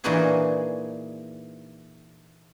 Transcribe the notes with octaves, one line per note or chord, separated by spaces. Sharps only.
A#2 E3 D4 D#4 F#4 G#4